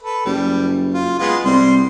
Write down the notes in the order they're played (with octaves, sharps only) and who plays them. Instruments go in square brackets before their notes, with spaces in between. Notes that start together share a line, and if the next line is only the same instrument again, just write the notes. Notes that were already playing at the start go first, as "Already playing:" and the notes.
[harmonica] A4 B4
[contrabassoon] F#1 [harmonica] G3
[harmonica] F4
G#3 B3 F4
[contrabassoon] C2 [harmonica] G3 C6